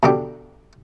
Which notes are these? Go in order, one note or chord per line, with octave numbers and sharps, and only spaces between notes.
B2 D3 G4